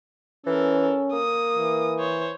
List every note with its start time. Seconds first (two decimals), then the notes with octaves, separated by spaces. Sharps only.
0.47 E3 C#4 A4 A#4
1.13 A#3 D#6
1.57 E3
1.99 C5 C#5